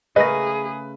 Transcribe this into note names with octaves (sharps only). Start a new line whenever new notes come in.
C#3 A3 G#4 A#4 B4 D#5 A#6